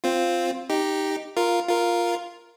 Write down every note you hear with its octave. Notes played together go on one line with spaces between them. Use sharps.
C4 F4
D#4 G4
F4 A#4
F4 A#4